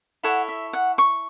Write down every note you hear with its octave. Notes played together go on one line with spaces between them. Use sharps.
E4 A4 C#5 F#5
E5
F#5
C#6